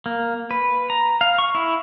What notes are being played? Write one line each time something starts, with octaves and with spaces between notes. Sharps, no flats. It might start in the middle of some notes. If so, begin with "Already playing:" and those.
A#3
B4
A#5
F5
C#6
E4